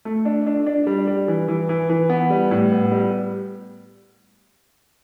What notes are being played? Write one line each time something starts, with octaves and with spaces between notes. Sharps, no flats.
A3
D4
D4
D4
G3
G3
E3
E3
E3
E3
B3
G3
A2
B3
G3